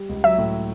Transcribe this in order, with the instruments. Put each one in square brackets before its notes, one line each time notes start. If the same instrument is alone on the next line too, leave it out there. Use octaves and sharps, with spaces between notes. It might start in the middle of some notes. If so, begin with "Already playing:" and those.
Already playing: [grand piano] G3
C#2
[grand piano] F#3 [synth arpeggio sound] E5
[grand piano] A2